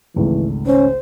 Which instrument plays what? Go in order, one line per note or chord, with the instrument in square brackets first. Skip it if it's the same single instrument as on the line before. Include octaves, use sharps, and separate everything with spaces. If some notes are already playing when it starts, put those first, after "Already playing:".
[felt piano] G#1 C#2 A3 [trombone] E3
[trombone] C#4 [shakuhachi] C5